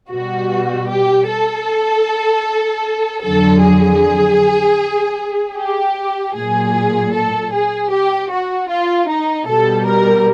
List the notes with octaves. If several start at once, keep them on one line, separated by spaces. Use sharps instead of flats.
B2 G3 F#4
G4
A4
F2 D3 F#3 A4
G#4
G4
A#2 F#3 G#4
A4
G#4
G4
F#4
F4
D#4
B2 G3 A4
A#4